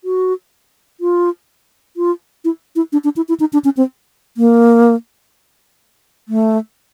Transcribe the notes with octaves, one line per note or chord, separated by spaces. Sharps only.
F#4
F4
F4
E4
E4
D4
D4
E4
E4
D#4
D4
C#4
C4
A#3
A3